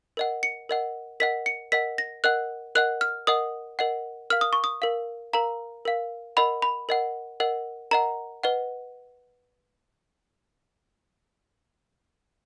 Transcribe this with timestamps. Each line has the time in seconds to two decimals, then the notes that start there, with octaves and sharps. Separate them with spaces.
0.17 A#4 D#5 F#5
0.43 C#7
0.69 A#4 D#5 F#5
1.20 A#4 D#5 F#5 B6
1.46 C#7
1.72 A#4 D#5 F#5 B6
1.98 A#6
2.24 A#4 D#5 F#5 F#6
2.75 A#4 D#5 F#5 F#6
3.01 F6
3.27 A#4 D#5 F#5 D#6
3.79 A#4 D#5 F#5
4.30 A#4 F5 F6
4.41 D#6
4.53 C#6
4.64 D#6
4.82 A#4 F5
5.33 A#4 F5 A#5
5.85 A#4 F5
6.37 A#4 D#5 F#5 B5
6.62 B5
6.89 A#4 D#5 F#5
7.40 A#4 D#5 F#5
7.91 A#4 D#5 F#5 A#5
8.43 B4 D#5 F#5